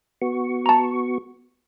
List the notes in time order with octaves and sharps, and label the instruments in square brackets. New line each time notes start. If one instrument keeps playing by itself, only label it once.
[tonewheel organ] B3 F#4 C#6
[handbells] A5 A#5